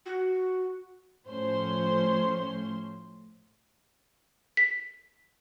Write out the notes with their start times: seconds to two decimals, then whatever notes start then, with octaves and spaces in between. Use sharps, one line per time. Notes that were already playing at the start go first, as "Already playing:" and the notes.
0.06 F#4
1.28 A2 F3 C#4 C5 C#5 C6
4.57 B6